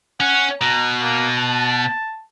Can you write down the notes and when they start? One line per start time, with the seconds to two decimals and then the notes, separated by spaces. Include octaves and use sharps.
0.20 C#4 F#5
0.61 B2 A#5
1.02 A#3
1.39 A5